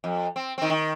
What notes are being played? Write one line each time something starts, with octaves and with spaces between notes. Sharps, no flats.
F2
C4
D#3 C4
D#3